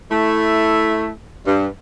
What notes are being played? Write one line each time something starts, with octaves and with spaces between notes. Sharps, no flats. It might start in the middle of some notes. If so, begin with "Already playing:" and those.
A3 E4
G2